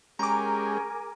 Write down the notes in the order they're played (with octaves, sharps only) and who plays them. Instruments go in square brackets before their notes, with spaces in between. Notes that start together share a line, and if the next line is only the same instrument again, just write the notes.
[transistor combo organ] G#3 C#4 G4 [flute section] G#4 A#4 G#5 [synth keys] A#5 D6